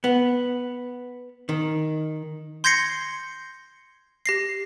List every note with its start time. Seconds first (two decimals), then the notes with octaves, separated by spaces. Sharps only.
0.04 B3
1.49 D#3
2.64 C6 G6 G#6 A#6 C7 C#7
4.26 G4 A#6 C7